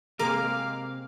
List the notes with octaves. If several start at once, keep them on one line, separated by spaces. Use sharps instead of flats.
C3 G#3 A#3 C4 A#4 F5 D6